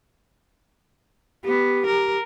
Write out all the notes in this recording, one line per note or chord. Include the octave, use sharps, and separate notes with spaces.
B3 G4
A#4